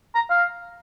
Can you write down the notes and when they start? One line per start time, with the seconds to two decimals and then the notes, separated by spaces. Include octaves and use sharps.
0.15 A#5
0.30 F5